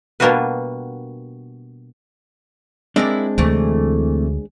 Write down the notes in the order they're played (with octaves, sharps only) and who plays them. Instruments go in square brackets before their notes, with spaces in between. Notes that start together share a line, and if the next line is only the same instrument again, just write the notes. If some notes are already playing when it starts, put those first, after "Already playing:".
[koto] B2 G3 A#3 D4 F#4 B4
[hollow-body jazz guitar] G#3 C4 D4 [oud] E4 A#4 D5
[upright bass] D2 [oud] C3 E3 A3